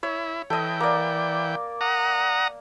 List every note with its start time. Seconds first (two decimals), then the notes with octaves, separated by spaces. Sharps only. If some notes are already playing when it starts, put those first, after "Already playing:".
0.03 E4 C#5
0.50 E3 A4 D#5 G5
0.80 A#3 D5
1.81 F#5 A#5 D#6